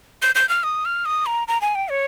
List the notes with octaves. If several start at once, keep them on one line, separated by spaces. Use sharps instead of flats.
G6
G6
F6
D#6
F6
D#6
A#5
A#5
G#5
G5
C#5